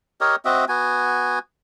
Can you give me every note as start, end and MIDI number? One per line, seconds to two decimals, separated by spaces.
0.21 0.36 67
0.21 0.36 70
0.21 0.36 73
0.21 0.36 75
0.45 0.65 60
0.45 0.65 66
0.45 0.65 75
0.45 0.65 76
0.69 1.39 59
0.69 1.39 66
0.69 1.39 80